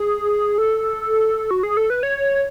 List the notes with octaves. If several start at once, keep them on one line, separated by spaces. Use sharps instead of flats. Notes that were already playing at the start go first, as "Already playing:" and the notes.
Already playing: G#4
A4
F#4
G#4
A4
B4
C#5